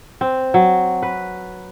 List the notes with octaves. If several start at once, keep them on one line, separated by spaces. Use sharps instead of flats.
C4
F#3
B4